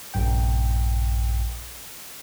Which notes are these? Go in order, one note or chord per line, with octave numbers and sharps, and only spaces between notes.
A#1 G2 G5